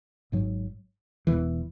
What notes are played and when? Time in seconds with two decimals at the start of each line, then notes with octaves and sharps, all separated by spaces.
0.32 G#1 G#2 F#3
1.27 E1 E2 E3